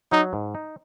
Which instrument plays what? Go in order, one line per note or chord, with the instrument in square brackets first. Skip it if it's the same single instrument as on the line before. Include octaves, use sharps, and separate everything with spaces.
[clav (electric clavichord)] F#3 [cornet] D#4
[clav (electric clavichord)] G#2
D#4